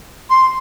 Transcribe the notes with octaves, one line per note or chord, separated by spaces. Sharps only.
C6